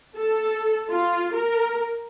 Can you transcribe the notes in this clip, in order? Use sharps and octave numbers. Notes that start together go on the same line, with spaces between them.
A4
F4
A#4